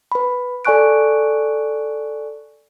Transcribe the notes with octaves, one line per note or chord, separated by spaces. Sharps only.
B4 B5
A4 D5 G#5 C#6 F#6 D7